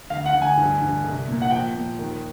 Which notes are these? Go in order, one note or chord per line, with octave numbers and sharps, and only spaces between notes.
D2 F5
F#5
D2
G#5
G2
G2
C2
A#2
F#5
F3 G5
A#2
D#2